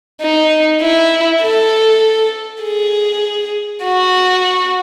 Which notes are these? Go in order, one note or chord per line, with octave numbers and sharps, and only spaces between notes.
D#4
E4
A4
G#4
F#4